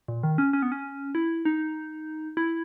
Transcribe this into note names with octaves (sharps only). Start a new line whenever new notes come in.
A#2
D#3
C#4
C#4
B3
C#4
E4
D#4
E4